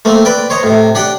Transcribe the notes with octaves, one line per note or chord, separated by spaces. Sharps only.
A3 A#3 C4
B4 D5 G5
C5 C#5 D#5 A#5
A2 C3
D4 G4 F#5 G5